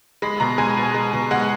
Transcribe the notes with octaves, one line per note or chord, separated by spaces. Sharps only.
G#3 B5
B2 A#5
G#3 G#5
B2
G#3
B2
G#3 F#5